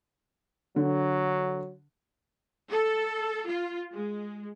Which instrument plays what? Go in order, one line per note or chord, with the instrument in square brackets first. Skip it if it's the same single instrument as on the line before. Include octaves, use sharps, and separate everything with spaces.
[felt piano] D3 [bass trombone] F#3
[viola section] A4
F4
G#3